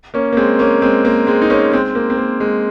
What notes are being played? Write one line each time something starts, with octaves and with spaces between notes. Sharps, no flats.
A#3 C#4
A#3
G#3 C4
A#3 C#4
G#3 C4
A#3
G#3 C4
D#4
A#3 C#4
G#3 C4
A#3
C4
A#3
G#3